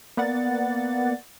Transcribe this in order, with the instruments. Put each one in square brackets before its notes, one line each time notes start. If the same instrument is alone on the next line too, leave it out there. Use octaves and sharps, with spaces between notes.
[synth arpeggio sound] A#3 B3 D5 F#5 A6